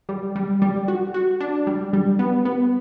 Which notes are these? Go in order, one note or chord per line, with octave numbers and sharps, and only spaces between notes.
G3
G3
G3
F#4
F#4
D4
G3
G3
B3
B3